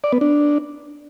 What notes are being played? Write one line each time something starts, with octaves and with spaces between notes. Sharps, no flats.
D5
B3
D4